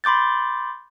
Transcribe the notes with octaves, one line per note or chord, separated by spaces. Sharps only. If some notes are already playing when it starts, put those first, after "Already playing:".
B5 C6 D6 G6 A6